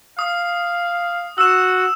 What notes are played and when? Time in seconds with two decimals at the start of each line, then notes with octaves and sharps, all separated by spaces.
0.19 F5 D#6
1.38 F#4 E6 E7